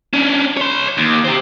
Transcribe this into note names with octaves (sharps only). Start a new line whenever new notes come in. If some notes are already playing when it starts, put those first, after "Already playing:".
C#4 D4
C#5 C6
D#2
G4 C5